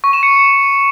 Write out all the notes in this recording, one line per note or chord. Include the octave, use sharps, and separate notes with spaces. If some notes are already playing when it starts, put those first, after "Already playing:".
C#6
E7
C#7